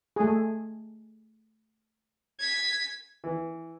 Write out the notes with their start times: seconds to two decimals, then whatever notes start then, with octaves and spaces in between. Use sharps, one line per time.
0.16 A3 G#4
2.39 G#6 B6
3.24 E3